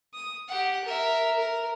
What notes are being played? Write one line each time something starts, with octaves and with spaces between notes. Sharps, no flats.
D#6
G4 F#5
A#4 E5
A#4